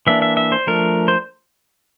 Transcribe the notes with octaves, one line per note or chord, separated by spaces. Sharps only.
E3 A#3 D4 E5
E5
E5
C5
F3 A3 D4 A#4
C5